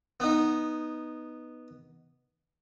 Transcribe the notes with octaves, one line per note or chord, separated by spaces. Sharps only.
B3 D#4